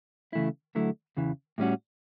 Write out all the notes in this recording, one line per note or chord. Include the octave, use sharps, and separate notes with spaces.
C#3 E3 A3 E4
D2 D3 F#3 A3 E4
E2 C#3 E3
A2 G3 C#4 F#4